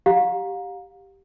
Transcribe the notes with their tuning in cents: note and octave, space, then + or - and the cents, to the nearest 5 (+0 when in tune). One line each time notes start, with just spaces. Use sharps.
G4 +0 F5 +35 A#5 +15